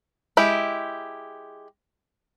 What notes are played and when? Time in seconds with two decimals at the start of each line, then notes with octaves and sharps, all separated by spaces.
0.37 G#3 E4 G4